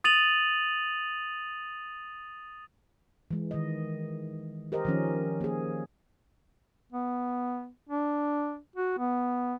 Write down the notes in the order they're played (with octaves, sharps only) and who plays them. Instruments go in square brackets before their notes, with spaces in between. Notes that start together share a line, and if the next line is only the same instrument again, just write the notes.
[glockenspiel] D#6 A6 D#7 F7 F#7
[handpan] E3 G#3
D#3 D#5
G4 A#4 C5 D#5
D#3 F3 C#4
A#3 G#4
[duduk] B3
D4
F#4
B3